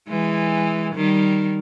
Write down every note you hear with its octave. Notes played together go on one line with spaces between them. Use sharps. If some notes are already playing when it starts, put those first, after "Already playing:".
E3 G#3
D#3 G3